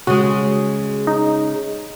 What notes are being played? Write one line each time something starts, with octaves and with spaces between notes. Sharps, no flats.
C#3 G#3 F#4
D#4